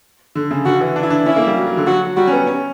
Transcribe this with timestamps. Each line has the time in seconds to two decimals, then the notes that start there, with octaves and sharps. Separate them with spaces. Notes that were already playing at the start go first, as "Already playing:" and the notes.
0.35 D3
0.51 C#3
0.65 D3 F#4
0.81 E3
0.96 D4
1.03 E4
1.10 D4
1.26 C#4 E4
1.36 A#3
1.47 G3
1.56 F#3
1.66 F#3
1.77 D3
1.87 F#3 F#4
2.05 F#3
2.17 G3 F#4
2.27 C#4
2.32 B3
2.47 C#4